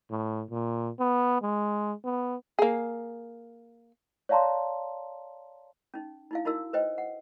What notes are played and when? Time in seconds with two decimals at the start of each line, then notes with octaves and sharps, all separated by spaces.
0.10 A2
0.50 A#2
1.00 B3
1.42 G#3
2.04 B3
2.59 A#3 G#4
4.29 C#5 D5 F5 A5 A#5 C6
5.94 C#4 D#4
6.31 D#4 E4 F5
6.45 D#4 E4 F#4 A#4 E6
6.73 B4 C5 D#5 G5
6.98 F#5